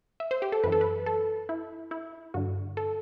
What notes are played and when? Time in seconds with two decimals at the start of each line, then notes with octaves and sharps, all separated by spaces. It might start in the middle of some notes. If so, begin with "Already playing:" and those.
0.20 E5
0.31 C5
0.42 G4
0.52 A4
0.64 F#2 E3 B4
0.72 A4
0.81 B4
1.06 A4
1.49 E4
1.91 E4
2.34 G2 D3 F#4
2.77 A4